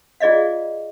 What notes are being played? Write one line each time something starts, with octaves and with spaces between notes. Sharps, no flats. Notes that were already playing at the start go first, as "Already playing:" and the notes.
F4 G#4 D5 D#5 F5